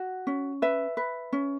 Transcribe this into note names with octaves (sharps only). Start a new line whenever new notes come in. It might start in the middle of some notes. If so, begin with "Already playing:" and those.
Already playing: F#4
C#4
B4 E5
B4
C#4